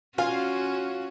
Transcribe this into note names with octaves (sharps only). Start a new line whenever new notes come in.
C#4 F4 F#4 F5 G#5